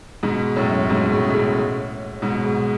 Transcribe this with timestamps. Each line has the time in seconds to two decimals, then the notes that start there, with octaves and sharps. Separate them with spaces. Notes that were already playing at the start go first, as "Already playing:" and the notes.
0.23 G#2 B2
0.56 F#2 A2
0.90 G#2 B2
1.11 A2 C#3
1.29 B2
1.34 A2 C#3
2.22 G#2 B2
2.45 G#2